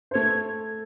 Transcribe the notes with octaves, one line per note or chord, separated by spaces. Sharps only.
C5
A3 A4 G#6